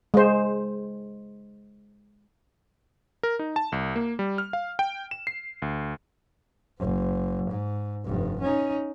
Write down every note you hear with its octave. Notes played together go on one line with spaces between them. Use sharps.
G#3 C5
A#4
D#4
A5
C2
A#3
G3
F6
F5
G5
E7
C7
D2
F#1
G#2
F1 G2
C#4 D#4